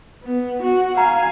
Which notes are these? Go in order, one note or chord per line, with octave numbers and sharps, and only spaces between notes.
B3
F#4
F5 G#5 A#5